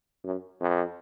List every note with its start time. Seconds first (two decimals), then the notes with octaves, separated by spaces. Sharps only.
0.24 F#2
0.61 F2